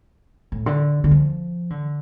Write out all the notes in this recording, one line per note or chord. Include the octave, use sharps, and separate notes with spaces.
A2
D3
D3
F3
D3